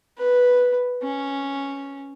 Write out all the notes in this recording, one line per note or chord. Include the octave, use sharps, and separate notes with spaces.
B4
C#4